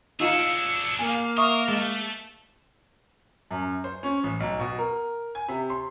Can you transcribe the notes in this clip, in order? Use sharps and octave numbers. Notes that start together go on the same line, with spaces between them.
D4 D#4 F4 G#4 E6 C#7
A#3 F5 G#5
A#4 E5 C#6 D#6
G#3 A3 A4
F#2
C5
C#4
A1
B1
B2
A#4
G#5
C3
C6